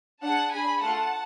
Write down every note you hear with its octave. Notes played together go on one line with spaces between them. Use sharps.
D4 G#4 F#5 A5
D4 G#4 G#5 B5
A3 F4 A4 F#5 A5